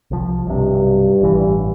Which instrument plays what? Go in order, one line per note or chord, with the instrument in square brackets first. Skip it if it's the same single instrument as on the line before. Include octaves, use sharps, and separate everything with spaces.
[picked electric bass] C2 F3
[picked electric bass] B1 C3 [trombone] G2
[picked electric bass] A1 E3